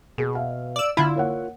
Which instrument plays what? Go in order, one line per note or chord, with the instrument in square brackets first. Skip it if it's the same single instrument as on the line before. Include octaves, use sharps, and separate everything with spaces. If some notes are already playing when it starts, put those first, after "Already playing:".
[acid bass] B2 [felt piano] G#4
[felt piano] E5 F5
[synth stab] D5 E6
[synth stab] D3 E4 [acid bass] F4 [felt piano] B5
[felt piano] A#3 C#5 F#5